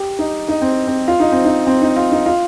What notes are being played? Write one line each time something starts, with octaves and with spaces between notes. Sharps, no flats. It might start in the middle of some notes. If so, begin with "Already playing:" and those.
Already playing: G4
D#4
D#4
C4
C4
F4
D#4
C4
D#4
C4
D#4
F4
D#4
F4